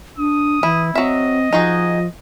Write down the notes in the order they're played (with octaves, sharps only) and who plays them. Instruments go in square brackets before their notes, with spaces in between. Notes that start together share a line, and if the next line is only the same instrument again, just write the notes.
[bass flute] D4 [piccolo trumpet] D#6
[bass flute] E3 [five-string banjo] E4
[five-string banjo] F#3 E5 [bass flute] C4 [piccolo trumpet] D#5
[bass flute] F3 [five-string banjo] D#4 F#4 G#4